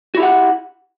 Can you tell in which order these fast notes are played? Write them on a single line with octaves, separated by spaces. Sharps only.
F#4 E4 G4 F#5